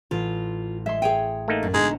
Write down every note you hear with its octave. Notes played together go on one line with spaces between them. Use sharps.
A1 F4
G#3 E5 C6
G#4 C#5 G5 D#7
A3 A#3 D#4
F#2
B2 D3 G#3 D#4